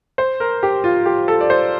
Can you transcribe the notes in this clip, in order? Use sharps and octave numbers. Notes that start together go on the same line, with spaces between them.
C5
A#4
G4
F4
G4
A4
D5
C5